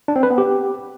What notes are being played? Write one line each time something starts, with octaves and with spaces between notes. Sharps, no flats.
D4
C4
B4
B3
G4